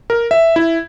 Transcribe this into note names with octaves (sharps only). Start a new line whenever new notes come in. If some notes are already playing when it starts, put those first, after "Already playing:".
A#4
E5
E4